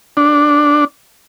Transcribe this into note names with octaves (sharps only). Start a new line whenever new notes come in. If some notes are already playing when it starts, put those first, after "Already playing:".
D4